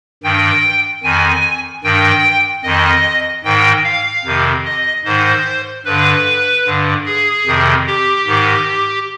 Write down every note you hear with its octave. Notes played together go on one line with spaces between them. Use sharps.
G2 D#3 G5
F2 D#3 G#5
G2 D#3 G5
F2 D#3 D#5
G#2 D#3 G5
F5
F2 C3 D#3
D#5
G#2 D#3 C5
G2 D3 B4
G2 D3
G#4
F2 C3 D#3
G4
G#2 D#3